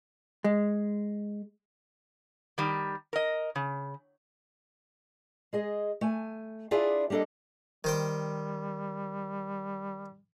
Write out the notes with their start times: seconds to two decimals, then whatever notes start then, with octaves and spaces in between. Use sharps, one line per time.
0.44 G#3
2.58 D#3 G3
3.13 A#4 D#5
3.56 C#3
5.53 G#3 G#4 D#5
6.01 A3 G#5
6.71 D4 E4 F4 G#4 D5 E5
7.10 G3 A#3 D4 A4 D#5
7.84 D#3 G3 C5 G5